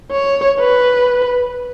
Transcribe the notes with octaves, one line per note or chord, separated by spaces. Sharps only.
C#5
B4